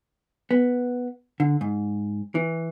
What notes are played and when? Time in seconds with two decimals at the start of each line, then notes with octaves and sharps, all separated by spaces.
0.51 B3
1.40 D3
1.61 G#2
2.35 E3